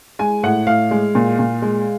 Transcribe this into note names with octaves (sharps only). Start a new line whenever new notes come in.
G#3 G#5
A2 F#5
A2 F5
G#3
A#2
A#2
G#3